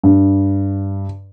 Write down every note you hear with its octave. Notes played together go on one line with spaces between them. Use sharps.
G2